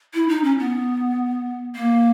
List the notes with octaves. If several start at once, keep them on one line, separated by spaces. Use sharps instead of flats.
E4
D#4
C#4
B3
A#3